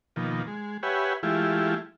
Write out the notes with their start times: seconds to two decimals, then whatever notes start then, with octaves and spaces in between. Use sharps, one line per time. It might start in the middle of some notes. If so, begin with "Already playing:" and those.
0.16 B2 D#3 F3 A#3
0.47 G#3
0.83 G4 B4 C#5 E5 F#5 G#5
1.23 E3 G#3 A3 E4 F4 G4